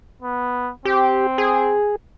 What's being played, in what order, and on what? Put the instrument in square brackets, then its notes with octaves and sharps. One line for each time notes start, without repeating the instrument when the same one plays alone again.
[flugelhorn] B3
[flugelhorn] C4 [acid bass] G4
[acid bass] G#4